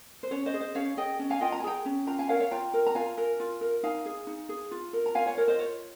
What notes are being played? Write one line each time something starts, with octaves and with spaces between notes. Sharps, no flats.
C5
C#4 C#5
C5 D#5
G#4
C5 D#5
C#4 C#5 F5
G#4 D#5 G5
C#4
F5 G#5
F4 D#5 G5
A#5
G#5
G#4 G5 A#5
C#4
F4 G5 A#5
F5 G#5
A#4 C#5 F5
C#5 F5
F4 G5 A#5
A#4
A#5
F4 F5 G#5
A#4
F4
A#4
D#4 F5 G#5
G#4
D#4
G#4
F4
A#4
A#5
F4 F5 G#5
C#5
A#4 C#5
C5 D#5
F4 C#5